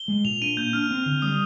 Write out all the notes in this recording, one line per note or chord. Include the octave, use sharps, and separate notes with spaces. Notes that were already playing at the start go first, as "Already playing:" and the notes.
Already playing: G7
G#3
A#2 F7
D4 D#7
A#3 G6
D4 F6
C4
D3
G3 D#6